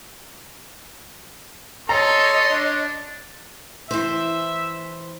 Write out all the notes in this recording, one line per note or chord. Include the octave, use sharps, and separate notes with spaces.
A4 C#5 D#5 A#5 C6
D4
E3 C5 E5